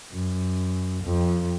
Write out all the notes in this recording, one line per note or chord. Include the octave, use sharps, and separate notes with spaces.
F#2
F2